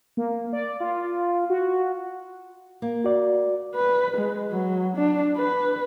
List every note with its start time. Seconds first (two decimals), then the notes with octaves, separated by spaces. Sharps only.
0.17 A#3
0.53 D5
0.80 F4
1.50 F#4
2.82 A#3
3.04 F#4 D5
3.75 B4
4.17 G#3
4.51 F#3
4.96 D4
5.37 B4